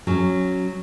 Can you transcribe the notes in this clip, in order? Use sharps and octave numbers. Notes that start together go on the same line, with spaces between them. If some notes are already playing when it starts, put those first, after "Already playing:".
F#3 C#4